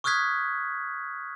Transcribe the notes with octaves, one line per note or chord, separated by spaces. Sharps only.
C#6 D#6 F6 F#6 G#6 B6